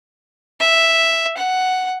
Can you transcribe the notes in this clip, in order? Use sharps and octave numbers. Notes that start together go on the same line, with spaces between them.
E5
F#5